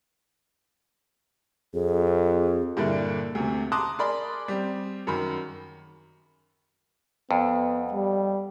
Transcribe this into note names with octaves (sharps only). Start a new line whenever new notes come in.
F2 G#4
G2 A#2 D3 A#3 D4 E4
D2 C3
A5 A#5 C6 D6 D#6 F#6
G#4 A#4 D5 B5 C6
G3 C4
F#2 D#3 B5
F2 B3
G3